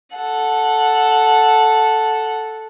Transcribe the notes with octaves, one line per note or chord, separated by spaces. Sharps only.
A4 F#5